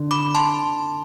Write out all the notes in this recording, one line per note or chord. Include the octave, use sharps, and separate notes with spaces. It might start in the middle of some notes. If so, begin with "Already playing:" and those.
Already playing: D3
B5 D6
A5 C6